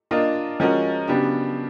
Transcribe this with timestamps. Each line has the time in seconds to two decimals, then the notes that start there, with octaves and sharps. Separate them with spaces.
0.11 A#3 D4 F4 A#4 D#5
0.60 F3 G#3 C#4 F#4 A#4
1.08 C#3 F#3 B3 D4 G4